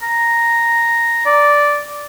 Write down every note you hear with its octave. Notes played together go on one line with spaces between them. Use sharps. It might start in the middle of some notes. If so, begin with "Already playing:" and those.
A#5
D5